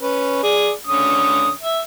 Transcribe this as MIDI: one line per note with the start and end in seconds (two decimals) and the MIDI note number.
0.01 0.40 61
0.01 0.40 71
0.43 0.71 68
0.43 0.71 74
0.87 1.50 50
0.87 1.50 61
0.87 1.50 87
1.62 1.80 76